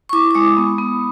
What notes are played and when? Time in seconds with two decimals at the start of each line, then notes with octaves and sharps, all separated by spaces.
0.09 C#6
0.13 E4 D6
0.31 D6
0.34 G#3 D#6
0.57 B3
0.78 B3